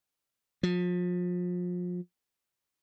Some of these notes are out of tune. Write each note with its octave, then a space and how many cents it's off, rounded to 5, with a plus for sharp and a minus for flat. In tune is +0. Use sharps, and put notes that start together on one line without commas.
F3 +35